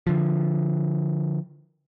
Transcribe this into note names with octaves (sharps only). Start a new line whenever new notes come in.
D3 F3